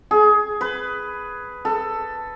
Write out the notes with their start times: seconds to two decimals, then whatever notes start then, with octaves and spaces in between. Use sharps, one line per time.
0.11 G#4
0.61 B4
1.65 A4